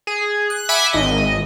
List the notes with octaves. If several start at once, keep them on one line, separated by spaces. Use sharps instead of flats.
G#4
F#6
E5 F#5 G#5 B5 D6
G#1 D#5